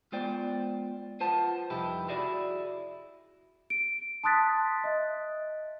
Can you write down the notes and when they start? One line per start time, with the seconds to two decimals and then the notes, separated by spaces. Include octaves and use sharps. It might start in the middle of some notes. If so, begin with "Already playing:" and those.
0.12 G#3 B3 F4 C5 D5 G5
1.20 F4 B4 C5 F#5 A5
1.70 C2 F2 D#4 E4 G4 B4
2.08 E4 F#4 G#4 D5
3.70 D7
4.24 A5 C6 D#6 F#6 A6 B6
4.84 D#5 E5